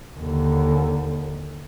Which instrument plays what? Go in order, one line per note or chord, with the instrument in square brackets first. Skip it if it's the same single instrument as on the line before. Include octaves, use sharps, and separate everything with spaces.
[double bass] D#2 D3